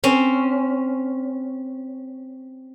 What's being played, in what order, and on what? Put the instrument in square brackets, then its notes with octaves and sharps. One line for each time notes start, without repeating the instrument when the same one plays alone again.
[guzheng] C4 C#4